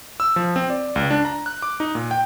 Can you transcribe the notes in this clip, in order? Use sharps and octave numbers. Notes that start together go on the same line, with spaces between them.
E6
F3
C4
D5
C#2
D4
A#5
F#6
D6
D#4
A#2
G5